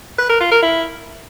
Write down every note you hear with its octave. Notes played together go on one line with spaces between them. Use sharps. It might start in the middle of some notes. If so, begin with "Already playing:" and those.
B4
A#4
F4
A#4
E4